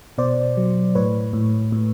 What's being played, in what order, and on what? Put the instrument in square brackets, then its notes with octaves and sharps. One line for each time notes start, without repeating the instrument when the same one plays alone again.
[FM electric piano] B2 C5 D5
F#3
A2 B4 C#5
A2
A2